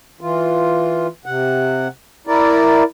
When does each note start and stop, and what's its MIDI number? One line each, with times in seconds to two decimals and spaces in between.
0.21 1.07 52
0.21 1.07 65
1.26 1.88 48
1.26 1.88 78
2.27 2.83 64
2.27 2.83 70
2.27 2.83 74